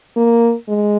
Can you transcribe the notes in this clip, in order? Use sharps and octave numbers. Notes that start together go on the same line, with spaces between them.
A#3
G#3